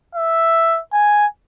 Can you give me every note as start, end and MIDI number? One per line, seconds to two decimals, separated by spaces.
0.15 0.79 76
0.93 1.26 80